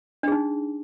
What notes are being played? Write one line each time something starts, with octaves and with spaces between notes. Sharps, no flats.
D4 D#4 G#4